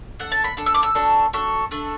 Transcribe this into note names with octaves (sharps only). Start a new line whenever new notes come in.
D4 A4 F#5
A5
B5
D4 A4
E6
D6
E6
D4 F#4 A4
D4 F#4 A4
A3 D4 A4